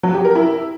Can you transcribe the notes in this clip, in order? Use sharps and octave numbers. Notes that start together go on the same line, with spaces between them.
F#3
G4
A#4
E4